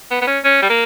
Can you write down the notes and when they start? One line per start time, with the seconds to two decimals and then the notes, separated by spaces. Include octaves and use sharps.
0.11 B3
0.21 B3
0.27 C#4
0.44 C#4
0.62 G3
0.70 A#3